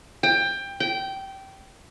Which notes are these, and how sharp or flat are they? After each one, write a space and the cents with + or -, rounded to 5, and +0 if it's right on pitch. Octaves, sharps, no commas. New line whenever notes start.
G5 +20
G5 -15